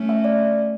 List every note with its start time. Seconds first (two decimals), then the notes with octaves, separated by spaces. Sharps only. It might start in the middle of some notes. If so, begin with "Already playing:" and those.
Already playing: A3 C#4
0.09 E5
0.24 D5